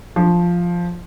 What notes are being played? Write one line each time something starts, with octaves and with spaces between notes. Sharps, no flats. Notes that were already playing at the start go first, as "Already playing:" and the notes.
F3